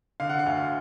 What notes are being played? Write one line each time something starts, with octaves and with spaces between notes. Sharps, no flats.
D3 F5
F#5
F5
D2